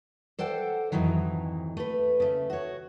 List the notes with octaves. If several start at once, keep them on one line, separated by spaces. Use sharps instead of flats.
A4 C5 D5 F#5 G5
F2 G#2 D#3 E3 F#3
A3 B4
C#3 A3
F#4 C#5